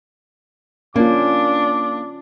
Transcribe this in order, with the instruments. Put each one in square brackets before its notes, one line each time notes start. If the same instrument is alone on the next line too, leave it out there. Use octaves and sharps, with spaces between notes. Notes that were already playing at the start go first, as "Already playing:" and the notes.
[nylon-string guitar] A#3 [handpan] C#4 F4 [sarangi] D4 [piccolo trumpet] D6